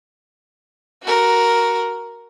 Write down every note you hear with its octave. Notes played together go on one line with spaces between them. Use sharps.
F#4 A#4